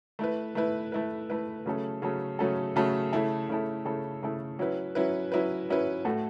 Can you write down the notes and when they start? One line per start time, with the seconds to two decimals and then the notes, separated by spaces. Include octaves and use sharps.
0.19 A3 E4 B4
0.55 A3 E4 B4
0.92 A3 E4 B4
1.30 A3 E4 B4
1.66 C#3 F#3 A3 C#4 A4
2.02 C#3 F#3 A3 C#4 A4
2.39 C#3 F#3 A3 C#4 A4
2.76 C#3 F#3 A3 C#4 A4
3.13 C#3 A3 E4 A4
3.49 C#3 A3 E4 A4
3.85 C#3 A3 E4 A4
4.22 C#3 A3 E4 A4
4.59 F#3 C#4 E4 B4
4.95 F#3 C#4 E4 B4
5.32 F#3 C#4 E4 B4
5.69 F#3 C#4 E4 B4
6.05 A2 A3 F#4 A4